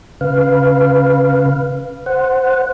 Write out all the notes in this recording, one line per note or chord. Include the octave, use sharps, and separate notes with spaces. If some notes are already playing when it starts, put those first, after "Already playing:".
C#3 B4 F5
C5 F#5